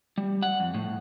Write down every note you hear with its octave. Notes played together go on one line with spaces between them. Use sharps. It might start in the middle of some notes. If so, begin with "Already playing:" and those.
G3
F#5
F2
A2